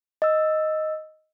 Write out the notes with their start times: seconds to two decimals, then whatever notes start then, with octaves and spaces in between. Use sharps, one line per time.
0.22 D#5 E6